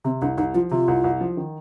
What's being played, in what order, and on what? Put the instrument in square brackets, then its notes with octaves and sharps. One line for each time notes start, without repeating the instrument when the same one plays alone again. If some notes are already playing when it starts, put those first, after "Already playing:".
[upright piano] C3 [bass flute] C4
[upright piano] C2 [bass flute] D4
[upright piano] C2 [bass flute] D#4
[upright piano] F3 [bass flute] F4
[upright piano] C3 [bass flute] F4
[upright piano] C2
C2
F3
D#3